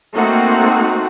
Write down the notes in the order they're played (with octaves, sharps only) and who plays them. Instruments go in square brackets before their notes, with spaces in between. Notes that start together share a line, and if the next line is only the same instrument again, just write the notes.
[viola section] A3 A#3 C4 D#4 F#4 F#5